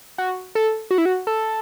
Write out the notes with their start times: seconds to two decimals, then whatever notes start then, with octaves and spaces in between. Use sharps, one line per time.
0.18 F#4
0.55 A4
0.91 F#4
0.98 E4
1.06 F#4
1.27 A4